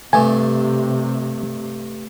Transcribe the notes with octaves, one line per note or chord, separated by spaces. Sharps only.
G2 C3 A3 G#5